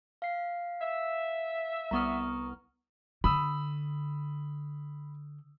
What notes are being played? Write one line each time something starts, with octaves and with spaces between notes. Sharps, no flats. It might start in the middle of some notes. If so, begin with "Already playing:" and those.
F5 C7
E5
C2 B3 A#5 C#6 D#6 F6
D3 B5 D#6 E6